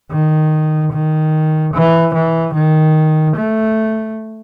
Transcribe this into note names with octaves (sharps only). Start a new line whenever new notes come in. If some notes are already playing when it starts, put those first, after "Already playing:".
D#3
D#3
E3
E3
D#3
A3